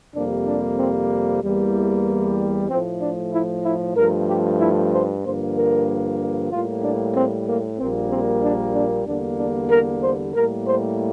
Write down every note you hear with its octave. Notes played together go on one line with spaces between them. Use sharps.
F2 C3 G3 A#3 D4
D4
C4
E2 E3 G3 A#3
A2 F3 A3 C4
D4
E4
E4
G2 F3 A3 A#4
G4
E4
C5
G2 D3 F3 A#3 C5
A#4
A2 G3 A#3 F4
D4
C4
A#3
A#1 A#2 G3 A#3 C4
C4
D4
D4
E2 D3 G3 A#3 D4
D4
A#4
C5
A2 G3 A#3 A#4
C5